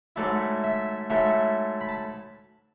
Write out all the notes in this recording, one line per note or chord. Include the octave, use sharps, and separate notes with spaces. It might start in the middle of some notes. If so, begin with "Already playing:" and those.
G#2 F#3 A3 E4 D5
E5
G#2 F#3 A3 E4 E5
B5
A5